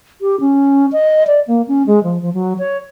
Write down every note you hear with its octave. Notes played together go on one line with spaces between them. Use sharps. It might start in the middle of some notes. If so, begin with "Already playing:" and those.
G4
C#4
D#5
D5
A#3
C#4
G#3
F3
F3
F#3
C#5